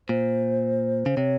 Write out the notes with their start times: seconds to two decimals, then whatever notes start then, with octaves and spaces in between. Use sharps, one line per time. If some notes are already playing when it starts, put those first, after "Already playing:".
0.09 A#2 C5
1.06 C#3
1.17 C3 C#5